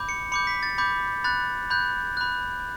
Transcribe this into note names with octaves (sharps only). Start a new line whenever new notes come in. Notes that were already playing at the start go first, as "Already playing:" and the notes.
Already playing: B5 D6 G6
C#7
B5 D6 G6 C#7
B6
A6
B5 D6 G6
B5 F#6 A6
B5 F#6 G6
B5 F#6